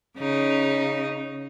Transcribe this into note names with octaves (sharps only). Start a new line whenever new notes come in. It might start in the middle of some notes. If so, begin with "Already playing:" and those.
C#3 D#4